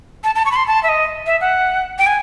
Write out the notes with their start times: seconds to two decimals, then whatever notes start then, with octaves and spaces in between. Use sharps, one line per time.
0.24 A5
0.35 A5
0.46 C#6
0.51 B5
0.56 C6
0.67 A5
0.83 E5
0.89 D#5
1.26 E5
1.41 F#5
1.98 G5
2.07 G#5